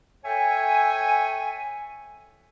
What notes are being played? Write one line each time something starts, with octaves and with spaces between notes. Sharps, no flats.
A4 C#5 E5 G5 G#5